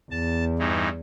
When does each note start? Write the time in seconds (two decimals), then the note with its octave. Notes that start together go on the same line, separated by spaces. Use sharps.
0.11 E2 A5
0.59 G2 E3 D#4